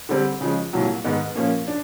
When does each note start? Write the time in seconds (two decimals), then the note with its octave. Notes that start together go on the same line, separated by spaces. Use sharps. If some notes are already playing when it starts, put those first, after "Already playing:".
0.09 D3 G3 C4
0.41 C#3 F3 G#3
0.73 C2 A#2 F#3
1.04 G#2 D#3 G#3 B3 D#4
1.35 A#2 F3 A#3 C#4
1.67 D4